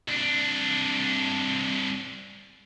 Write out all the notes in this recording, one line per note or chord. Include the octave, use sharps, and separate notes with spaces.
C2 D4